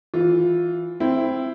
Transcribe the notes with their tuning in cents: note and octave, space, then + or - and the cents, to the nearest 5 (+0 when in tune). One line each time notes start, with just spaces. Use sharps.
E3 +0 F4 +15
C4 +0 E4 +10